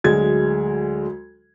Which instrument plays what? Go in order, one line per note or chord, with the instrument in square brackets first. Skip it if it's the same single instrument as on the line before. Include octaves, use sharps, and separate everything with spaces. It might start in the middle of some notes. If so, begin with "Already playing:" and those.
[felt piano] D2 F#3 G#3 G#6